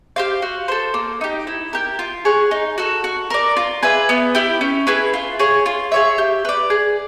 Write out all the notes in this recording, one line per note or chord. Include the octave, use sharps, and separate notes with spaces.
G4 C5 F5
F#4
A4 C5
A#3
D#4 G4
E4
G4 A#4
F4
G#4 C#5 F#5
D#4
F#4 A4
F#4
A#4 D5
F4
G#4 B4 E5
B3
E4 G4
C#4
E4 G#4 B4
F4
G#4 C#5
F4
G#4 C#5 E5
G4
B4 D5
G#4